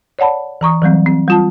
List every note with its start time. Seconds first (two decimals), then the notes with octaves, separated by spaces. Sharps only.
0.19 C#5 D5 F#5 A5 B5
0.61 E3 A#5 C#6 D#6
0.82 E3 F#3 G3 C4
1.06 C4
1.28 G3 F4 A5